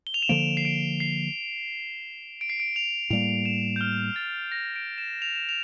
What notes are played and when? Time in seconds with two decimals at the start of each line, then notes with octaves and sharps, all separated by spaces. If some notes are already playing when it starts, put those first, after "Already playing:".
0.07 G7
0.14 F7
0.22 E7
0.29 D3 F3 A#3 D7
0.57 C7
0.65 D7
1.00 C7
2.41 D7
2.50 C7
2.60 D7
2.76 F7
3.10 A2 G3 A#3 F7
3.45 E7
3.76 G6
3.81 F6
4.16 A6
4.52 A#6
4.76 D7
4.98 E7
5.22 F7
5.36 E7
5.49 F7